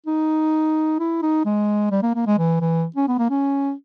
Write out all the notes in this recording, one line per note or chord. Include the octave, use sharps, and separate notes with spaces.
D#4
E4
D#4
G#3
G3
A#3
A#3
G#3
E3
E3
C#4
B3
A#3
C#4